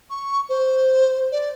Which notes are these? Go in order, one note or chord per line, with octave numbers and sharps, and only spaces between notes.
C#6
C5
D5